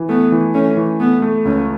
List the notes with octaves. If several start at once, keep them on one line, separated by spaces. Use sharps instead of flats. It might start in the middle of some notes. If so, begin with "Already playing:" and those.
Already playing: E3
A3 B3
E3
A3 C#4
E3
A3 B3
A3
C#2 C#4